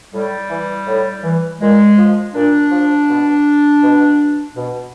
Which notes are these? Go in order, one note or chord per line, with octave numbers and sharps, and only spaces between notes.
A2 G3
E3
A2
E3
A#2 G#3
F3
A#2 D4
F3
B2
B2
B2